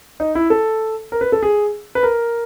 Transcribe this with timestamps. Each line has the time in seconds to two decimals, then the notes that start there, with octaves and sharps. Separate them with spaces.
0.20 D#4
0.35 E4
0.50 A4
1.12 A#4
1.21 B4
1.32 A4
1.43 G#4
1.95 B4
2.03 A#4